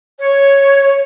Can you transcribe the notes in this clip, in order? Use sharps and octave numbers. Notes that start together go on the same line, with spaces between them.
C#5